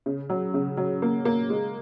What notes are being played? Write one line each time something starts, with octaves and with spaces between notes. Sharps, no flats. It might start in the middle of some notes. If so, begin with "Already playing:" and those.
C#3
F#3
C#3
F#3
A#3
A#3
G#3